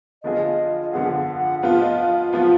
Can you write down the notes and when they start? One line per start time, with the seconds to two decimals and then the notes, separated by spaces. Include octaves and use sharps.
0.23 D3 F3 B3 F4 G#4 D#5
0.93 D3 F3 B3 F4 G#4 F#5
1.16 F#5
1.39 F#5
1.63 F3 B3 F4 F5
1.80 D#5
1.98 F5
2.16 F5
2.32 F3 B3 F4 F#5